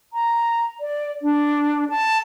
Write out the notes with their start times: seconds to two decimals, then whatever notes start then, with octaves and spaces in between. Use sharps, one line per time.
0.13 A#5
0.80 D5
1.22 D4
1.90 A5